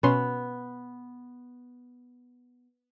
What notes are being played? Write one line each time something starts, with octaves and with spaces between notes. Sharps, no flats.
B2 B3 C#4 C6